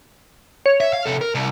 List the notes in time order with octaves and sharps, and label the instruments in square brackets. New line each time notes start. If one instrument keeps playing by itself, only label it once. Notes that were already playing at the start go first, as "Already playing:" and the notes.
[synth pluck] C#5
[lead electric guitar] E5
F5
C3 A4
A#4
C2